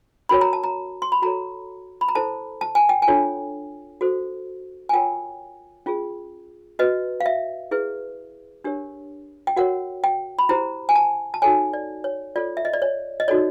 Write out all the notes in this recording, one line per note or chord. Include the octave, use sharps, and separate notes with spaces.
C#4 F#4 A#4 C#5 B5
A#5
A5
A#5
C6
B5
F#4 A4 C#5 A#5
B5
A#5
E4 A4 C5 A5
A5
G#5
G5
G#5
D4 F4 A4 C#5
F#4 A4 C5
G#5
F4 A#4 C#5 G5
C#4 F4 G#4
F#4 B4 D#5
F5
E5
E4 G#4 B4
D4 G4 A#4 C#5
G5
F#4 A#4 C#5 F#5
G5
B5
E4 G4 C5 A#5
G#5
A5
A5
D#4 F#4 A4 C#5 G#5
D5
C#5
F4 A4 C#5 D5
E5
D#5
D5
C#5
D#5
D#4 F#4 A4 C#5 D5